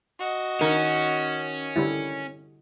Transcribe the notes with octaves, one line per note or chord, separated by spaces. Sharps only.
F#4 D#5
D#3 C#4 A#4
D3 G3 E4